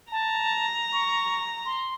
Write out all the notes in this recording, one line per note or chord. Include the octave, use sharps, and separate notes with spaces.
A5 A#5
C#6
C6